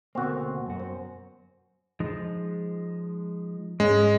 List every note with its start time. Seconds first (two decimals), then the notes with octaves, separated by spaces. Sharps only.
0.15 D2 B2 A#3 C4 F#4
0.66 F#2 F#4
0.80 C5
2.00 F3 G#3 D#4
3.80 G#2 G#3 C#4